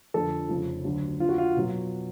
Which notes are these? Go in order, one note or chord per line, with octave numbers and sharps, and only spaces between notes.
F2 D3 F3 A4
F1 F2 C#3 F3
D2 D3 F#3
F2 D3 F3 F4
F#4
F4
B2 F#3